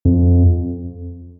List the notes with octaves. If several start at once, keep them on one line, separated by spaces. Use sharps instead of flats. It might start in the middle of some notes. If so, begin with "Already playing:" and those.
F2